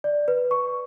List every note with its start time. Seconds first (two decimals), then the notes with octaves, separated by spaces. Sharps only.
0.04 D5
0.28 B4
0.51 C#6